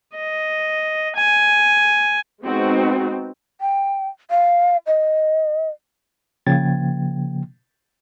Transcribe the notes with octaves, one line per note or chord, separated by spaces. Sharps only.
D#5
G#5
G#3 B3 C4 D#4 F#4
G5
F5
D#5
C#3 F3 A#3 G5 G#6 A6